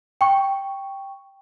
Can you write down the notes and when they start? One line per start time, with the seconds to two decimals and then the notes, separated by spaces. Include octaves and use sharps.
0.21 G5 C#6